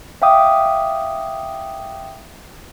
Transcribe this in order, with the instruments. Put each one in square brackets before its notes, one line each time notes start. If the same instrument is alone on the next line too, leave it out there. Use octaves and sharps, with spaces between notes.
[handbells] E5 F5 G5 D6 D#6